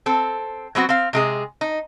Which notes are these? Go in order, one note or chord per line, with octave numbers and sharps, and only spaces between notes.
C4 A4
F#3 B3 C4 F#4
C4 F5
C3 G#3 G#4
D#4